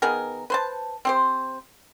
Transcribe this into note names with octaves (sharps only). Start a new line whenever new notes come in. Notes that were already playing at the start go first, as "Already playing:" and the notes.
D#3 B3 G#4 A#4
B4 C5 A5
C4 G4 C5